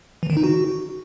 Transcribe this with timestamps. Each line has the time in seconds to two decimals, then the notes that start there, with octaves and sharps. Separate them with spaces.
0.23 E3
0.30 D#3
0.37 D#4
0.44 F#4